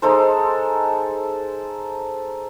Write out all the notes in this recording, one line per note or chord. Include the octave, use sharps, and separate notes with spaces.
G#3 D#4 A4 C5